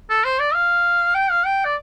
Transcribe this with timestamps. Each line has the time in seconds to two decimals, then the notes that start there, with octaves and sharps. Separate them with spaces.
0.10 A4
0.24 C5
0.39 D5
0.54 F5
1.14 G5
1.30 F5
1.45 G5
1.64 D5